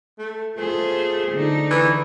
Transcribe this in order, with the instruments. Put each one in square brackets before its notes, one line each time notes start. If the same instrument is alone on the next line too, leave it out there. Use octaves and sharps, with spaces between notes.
[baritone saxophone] A3
[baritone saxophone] A3 [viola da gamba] F4 G#4 C5
[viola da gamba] D3 D#4
[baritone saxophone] E3